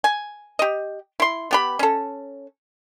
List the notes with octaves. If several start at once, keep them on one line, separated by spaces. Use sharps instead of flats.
G#5
G4 D#5
E4 C6
B3 G4 B5
C#4 A4